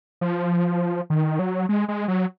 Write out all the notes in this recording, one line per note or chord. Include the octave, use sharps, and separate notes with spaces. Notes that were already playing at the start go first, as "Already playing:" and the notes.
F3
D#3
F#3
G#3
G#3
F#3